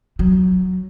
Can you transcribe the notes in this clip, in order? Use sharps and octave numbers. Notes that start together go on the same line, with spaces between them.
F#3